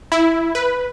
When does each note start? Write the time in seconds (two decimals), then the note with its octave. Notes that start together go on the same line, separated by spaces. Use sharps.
0.12 E4
0.55 B4